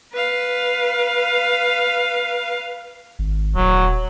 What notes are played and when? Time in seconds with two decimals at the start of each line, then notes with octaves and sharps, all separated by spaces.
0.13 B4 F5
3.19 G#1
3.56 D#1 F#3